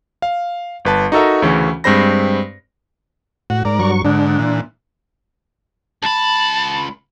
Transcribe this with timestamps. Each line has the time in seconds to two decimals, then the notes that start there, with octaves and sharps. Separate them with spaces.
0.22 F5
0.85 G1 B4 A5
1.12 D#4 F#4 A4 A#4 E5
1.42 D2 C#3 E3 C#4
1.84 G2 G#3 C4 C5 B5 A#6
3.50 A2 F#4
3.65 G#2 A#4 D5
3.79 G2 F#3 C#6
4.05 G#2 D3 D4
4.39 A#2 E3
6.02 C#2 A5 B5